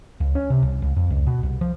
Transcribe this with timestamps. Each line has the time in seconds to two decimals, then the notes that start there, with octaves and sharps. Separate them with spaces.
0.20 C#2
0.35 C#4
0.50 C3
0.62 C2
0.82 C#2
0.96 F2
1.10 C#2
1.27 B2
1.43 C2
1.61 F3